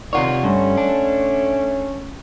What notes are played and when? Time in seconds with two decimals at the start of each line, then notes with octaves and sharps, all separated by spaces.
0.13 C3 D#3 F4 C#5 D5 F#5 C6
0.43 G2 A3 C#4
0.77 D4